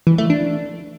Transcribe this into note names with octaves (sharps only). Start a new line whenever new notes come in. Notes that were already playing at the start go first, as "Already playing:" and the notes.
E3
A3
D4